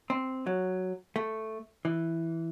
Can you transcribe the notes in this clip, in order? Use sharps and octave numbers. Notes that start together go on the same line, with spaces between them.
C4
F#3
A3
E3